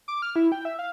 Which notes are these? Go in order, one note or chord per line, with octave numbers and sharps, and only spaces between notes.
D6
F6
E4
G5
E5
F5